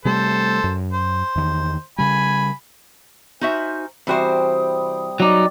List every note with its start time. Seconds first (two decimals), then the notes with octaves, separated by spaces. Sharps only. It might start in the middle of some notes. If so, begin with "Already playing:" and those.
0.05 C3 G3 A3 A4 C5
0.64 F#2
0.93 C5
1.35 E2 D#3
1.98 C#3 G3 G#5 B5
3.41 D#4 F#4 C5 E5 G#5 F6
4.07 C3 E3 G3 F#4 C5 G5 D#6
5.20 F#3 D#4 D5 D#5 D6